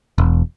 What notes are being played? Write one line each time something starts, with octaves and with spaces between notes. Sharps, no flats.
E1